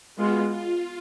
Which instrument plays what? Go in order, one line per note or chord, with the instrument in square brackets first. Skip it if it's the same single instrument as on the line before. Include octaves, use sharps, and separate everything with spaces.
[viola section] G#3 B3 F4 [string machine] F#4
[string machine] F4